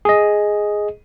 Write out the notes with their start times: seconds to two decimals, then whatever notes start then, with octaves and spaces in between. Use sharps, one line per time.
0.05 G#4 D#5